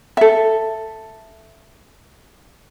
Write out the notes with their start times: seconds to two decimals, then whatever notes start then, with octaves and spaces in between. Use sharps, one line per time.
0.17 A4 E5